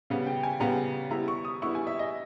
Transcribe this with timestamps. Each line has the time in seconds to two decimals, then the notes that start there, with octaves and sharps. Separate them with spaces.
0.10 C#3 G3 B3
0.27 G5
0.43 G#5
0.60 C#3 G3 B3 A#5
1.10 G3 B3 E4 A#5
1.28 C#6
1.45 D#6
1.62 G3 B3 E4 C#6
1.75 G#5
1.87 E5
1.99 D#5